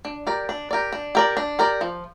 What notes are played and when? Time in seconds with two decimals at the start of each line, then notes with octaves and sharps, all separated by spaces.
0.05 D4
0.27 G4 A#4 D5
0.49 D4
0.71 G4 A#4 D5
0.92 D4
1.15 G4 A#4 D5
1.37 D4
1.59 G4 A#4 D5
1.81 F3